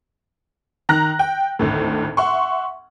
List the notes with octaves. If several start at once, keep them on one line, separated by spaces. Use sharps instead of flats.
D#3 A#5 F#6 A#6
G5
G#1 D2 A2
E5 F#5 C6 C#6